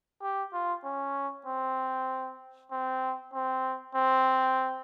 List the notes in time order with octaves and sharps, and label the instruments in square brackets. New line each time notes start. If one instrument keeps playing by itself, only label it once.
[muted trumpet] G4
F4
C#4
C4
C4
C4
C4